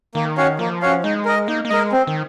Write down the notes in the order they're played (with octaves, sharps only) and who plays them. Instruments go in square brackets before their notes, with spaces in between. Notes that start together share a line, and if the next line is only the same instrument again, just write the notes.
[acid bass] D#3 [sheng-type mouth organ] A#3
[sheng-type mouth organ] C#4 F#4 C#5 F5
[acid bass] F3 [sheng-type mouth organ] A#3
[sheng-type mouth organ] C#4 F#4 C#5 F5
[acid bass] G#3 [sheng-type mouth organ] D#4
[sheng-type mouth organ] A#4 D#5
[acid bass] A#3 [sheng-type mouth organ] D#4
[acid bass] A#3
[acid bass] G#3 [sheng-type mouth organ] A#4 D#5
[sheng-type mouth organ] C4
[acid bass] D#3